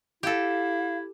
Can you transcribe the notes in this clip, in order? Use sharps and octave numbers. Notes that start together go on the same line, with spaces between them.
E4 G4 A4 F5